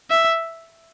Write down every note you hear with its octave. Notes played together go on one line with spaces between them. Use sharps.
E5